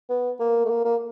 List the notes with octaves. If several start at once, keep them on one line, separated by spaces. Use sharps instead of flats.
B3
A#3
A3
A#3
A#3